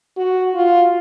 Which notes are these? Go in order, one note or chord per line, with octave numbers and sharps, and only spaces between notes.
F#4
F4